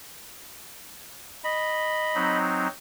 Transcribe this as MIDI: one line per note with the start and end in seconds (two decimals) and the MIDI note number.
1.44 2.38 75
1.44 2.38 83
2.15 2.67 54
2.15 2.67 60
2.15 2.67 63